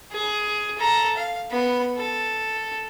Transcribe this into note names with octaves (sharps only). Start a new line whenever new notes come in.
G#4
A4 A#5
F5
B3 B5
A4